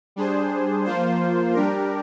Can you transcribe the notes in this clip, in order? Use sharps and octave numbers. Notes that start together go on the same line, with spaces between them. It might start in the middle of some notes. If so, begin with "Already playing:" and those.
G3 D4 G#4 C5
F3 A#3 F4 C5
G3 D4 G4 A#4